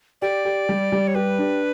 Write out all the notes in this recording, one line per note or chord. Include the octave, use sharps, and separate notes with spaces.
G4 D5
G4
G3
G3
C#5
G4 B4
D4